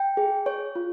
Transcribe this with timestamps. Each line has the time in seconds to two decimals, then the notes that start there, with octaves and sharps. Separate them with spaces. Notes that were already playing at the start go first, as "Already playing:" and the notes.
Already playing: G5
0.17 G#4
0.46 C#5
0.75 F4